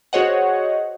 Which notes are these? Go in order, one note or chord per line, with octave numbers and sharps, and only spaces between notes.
F#4 G#4 C5 C#5 D#5 F#5